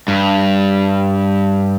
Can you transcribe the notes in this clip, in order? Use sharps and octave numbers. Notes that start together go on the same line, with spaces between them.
G2